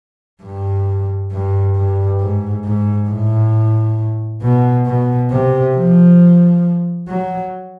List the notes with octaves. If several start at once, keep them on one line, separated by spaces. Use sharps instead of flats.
G2
G2
G2
G#2
G#2
A2
B2
B2
C3
F3
F#3